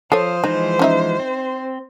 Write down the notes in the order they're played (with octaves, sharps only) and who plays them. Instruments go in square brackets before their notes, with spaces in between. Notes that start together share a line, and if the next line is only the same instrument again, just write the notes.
[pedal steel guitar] F3 F5 D#6 [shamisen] A4 C#5 [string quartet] C5
[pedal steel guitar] E3 F3 G#3 [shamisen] D#4
[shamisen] C#4 D#4 E5
[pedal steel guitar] C4